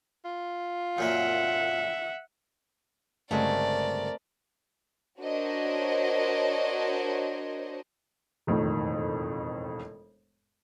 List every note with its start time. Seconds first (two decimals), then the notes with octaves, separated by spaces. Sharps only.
0.25 F4
0.98 F#2 A#2 A#3 E5 F#5
3.31 G1 C#3 G#3 A3 C4 A#4 D5
5.21 D4 F#4 A#4 C5 C#5 D#5
8.47 E1 F2 A2 D#3